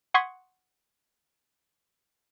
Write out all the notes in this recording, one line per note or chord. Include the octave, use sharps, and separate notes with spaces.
F#5 C6 C#6 D#6 G#6 B6